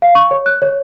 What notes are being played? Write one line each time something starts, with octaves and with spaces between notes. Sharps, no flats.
F5
C#6
C#5
F#6
C#5